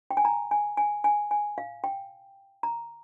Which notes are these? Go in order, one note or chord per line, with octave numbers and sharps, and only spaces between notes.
G5
G#5
A#5
G#5
G#5
G#5
G#5
F5
G5
A#5